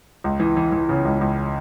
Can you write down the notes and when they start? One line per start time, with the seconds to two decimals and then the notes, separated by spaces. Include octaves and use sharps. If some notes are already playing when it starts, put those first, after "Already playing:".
0.24 C#2
0.40 E3
0.57 E3
0.72 E3
0.89 C#3
1.05 C#2
1.21 C#2